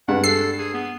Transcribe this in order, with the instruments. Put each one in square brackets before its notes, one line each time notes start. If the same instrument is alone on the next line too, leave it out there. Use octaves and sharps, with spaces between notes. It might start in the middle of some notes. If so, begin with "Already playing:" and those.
[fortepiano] G2 G#3 [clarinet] F#5
[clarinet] A4 [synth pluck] C7
[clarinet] G#4
B3